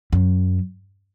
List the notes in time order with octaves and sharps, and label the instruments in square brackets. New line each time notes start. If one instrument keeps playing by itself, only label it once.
[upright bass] F#2